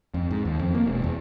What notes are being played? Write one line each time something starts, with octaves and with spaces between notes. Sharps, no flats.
F2
G#2
D#2
F2
A#3
E1
E2